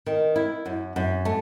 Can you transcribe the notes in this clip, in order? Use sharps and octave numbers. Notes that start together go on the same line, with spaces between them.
D#3
E4
F#2
F#2
A3